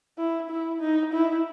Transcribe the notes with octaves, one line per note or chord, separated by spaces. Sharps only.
E4
E4
D#4
E4